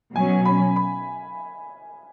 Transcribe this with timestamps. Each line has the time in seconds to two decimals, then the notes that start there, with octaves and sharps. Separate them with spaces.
0.15 B2 F#3 C#4 G#5
0.45 B5
0.76 B5